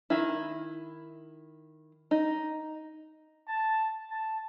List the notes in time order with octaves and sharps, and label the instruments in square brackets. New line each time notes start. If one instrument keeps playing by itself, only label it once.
[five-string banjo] D#3 E4
D#4
[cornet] A5
A5